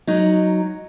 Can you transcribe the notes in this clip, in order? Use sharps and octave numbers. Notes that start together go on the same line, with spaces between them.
F#3 D#4